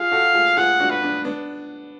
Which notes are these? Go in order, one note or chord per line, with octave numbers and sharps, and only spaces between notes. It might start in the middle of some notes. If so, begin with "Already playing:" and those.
Already playing: F4 G#4 F5
F#4 A4
F4 G#4
F4 G#4 F#5
D4 F#4
B4
B3 D4
B3 D4